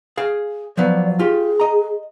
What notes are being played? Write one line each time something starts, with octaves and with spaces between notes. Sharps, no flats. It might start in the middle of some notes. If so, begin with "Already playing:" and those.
G#4 F5
F3 F#3 B3 D5
F4 G4 G#4
D#5 A#5